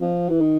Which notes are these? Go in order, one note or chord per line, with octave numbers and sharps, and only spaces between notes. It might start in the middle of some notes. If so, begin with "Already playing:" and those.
F3
E3
D#3